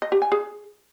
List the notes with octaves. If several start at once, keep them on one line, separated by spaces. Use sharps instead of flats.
D#5
G4
G#5
G#4